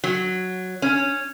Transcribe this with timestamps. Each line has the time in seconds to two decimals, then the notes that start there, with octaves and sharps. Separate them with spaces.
0.04 F#3
0.82 C#4